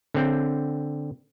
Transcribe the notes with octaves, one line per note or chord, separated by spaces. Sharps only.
D3 C4 G5